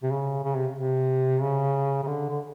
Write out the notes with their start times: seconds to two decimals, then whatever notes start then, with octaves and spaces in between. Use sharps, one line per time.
0.03 C3
0.11 C#3
0.44 C#3
0.56 C3
0.77 C3
1.42 C#3
2.03 C#3
2.07 D3
2.30 D3